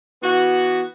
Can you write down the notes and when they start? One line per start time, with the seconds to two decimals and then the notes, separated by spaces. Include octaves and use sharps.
0.21 E3 B3 F#4